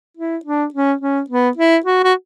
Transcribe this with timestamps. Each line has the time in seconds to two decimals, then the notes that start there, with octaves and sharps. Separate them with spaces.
0.17 E4
0.45 D4
0.74 C#4
1.01 C#4
1.30 B3
1.57 E4
1.86 F#4
2.04 F#4